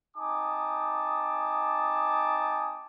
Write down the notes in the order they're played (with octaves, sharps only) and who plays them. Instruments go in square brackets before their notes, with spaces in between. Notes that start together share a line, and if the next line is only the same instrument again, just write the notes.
[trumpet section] C4 D#4 G#5 A5 D6 D#6